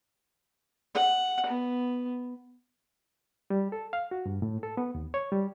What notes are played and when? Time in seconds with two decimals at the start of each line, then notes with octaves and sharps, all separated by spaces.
0.95 F#5
1.46 B3
3.50 G3
3.72 A4
3.93 F5
4.11 F#4
4.26 G2
4.42 A2
4.63 A4
4.77 B3
4.95 D#2
5.14 C#5
5.32 G3